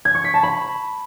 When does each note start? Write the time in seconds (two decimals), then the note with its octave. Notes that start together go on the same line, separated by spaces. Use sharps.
0.05 G#6
0.15 C#6
0.24 B6
0.34 A5
0.43 B5